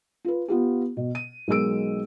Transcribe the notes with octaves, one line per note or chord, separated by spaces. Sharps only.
F4 B4
B3 F4 G4
B2
D#7
B1 G#3 A#4 E6 D7